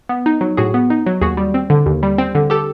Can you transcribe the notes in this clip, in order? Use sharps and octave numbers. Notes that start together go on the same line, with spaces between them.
B3
D#4
F#3
A2 F#4 G#4
B3
D#4
F#3
D#2 F#4 G#4
G3
C4
D3
D#2
G3
C4
D3
G4 A4